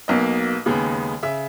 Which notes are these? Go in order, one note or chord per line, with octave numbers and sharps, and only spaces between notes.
B1 B2 A#3 D#5
D#2 C#3 G#3 B3
C#3 E5